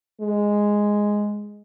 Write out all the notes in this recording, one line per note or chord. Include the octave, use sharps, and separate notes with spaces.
G#3